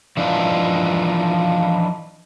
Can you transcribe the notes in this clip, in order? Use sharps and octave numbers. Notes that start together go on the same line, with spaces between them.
E3 F3 D4 D#4 F4